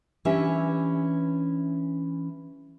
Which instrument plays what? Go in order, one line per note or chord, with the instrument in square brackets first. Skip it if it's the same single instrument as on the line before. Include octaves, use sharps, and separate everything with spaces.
[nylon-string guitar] E3 C#4 D4 G4 E5